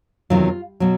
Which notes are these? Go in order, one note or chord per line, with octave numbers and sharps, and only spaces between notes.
E2 C3 D#3 F#3 F4
B2 F#3